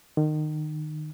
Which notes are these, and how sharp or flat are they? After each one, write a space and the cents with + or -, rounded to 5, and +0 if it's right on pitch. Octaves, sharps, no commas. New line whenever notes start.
D#3 -25